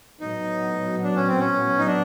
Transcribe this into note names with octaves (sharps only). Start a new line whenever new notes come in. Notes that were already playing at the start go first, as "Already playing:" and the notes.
A2 F#3 B3 D#4
D4
C#4
C4
C#4
D#4
D4